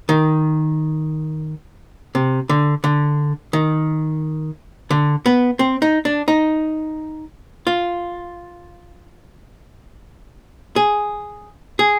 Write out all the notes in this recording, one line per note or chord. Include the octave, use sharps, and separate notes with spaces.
D#3
C3
D3
D3
D#3
D3
B3
C4
D#4
D4
D#4
F4
G#4
G#4